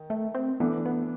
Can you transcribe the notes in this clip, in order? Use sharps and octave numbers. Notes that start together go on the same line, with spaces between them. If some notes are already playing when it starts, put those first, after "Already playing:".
Already playing: D#3
A3
C4
E3 A3 B3 D4
B3